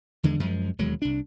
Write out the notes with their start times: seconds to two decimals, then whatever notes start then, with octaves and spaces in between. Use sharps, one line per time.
0.23 E2 D3 D#3 G#3
0.40 F#2 F3 G#3
0.78 E1 D#2 F#3 G#3
1.02 C2 D4